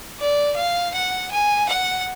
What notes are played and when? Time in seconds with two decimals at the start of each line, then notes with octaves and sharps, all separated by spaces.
0.19 D5
0.56 F5
0.94 F#5
1.31 G#5
1.69 F#5